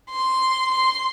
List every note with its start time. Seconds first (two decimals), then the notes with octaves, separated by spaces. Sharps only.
0.10 C6
0.72 C6